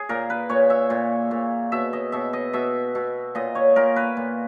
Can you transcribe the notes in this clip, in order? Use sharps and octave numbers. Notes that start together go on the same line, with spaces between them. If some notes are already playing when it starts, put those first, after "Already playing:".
Already playing: G#4
A#2 A#4
B4
A#2 C#5
E5
A#2
A#2
B2 E5
D#5
B2 E5
D#5
B2 E5
B2
A#2 D#5
C#5
A#2 A#4
B4
A#2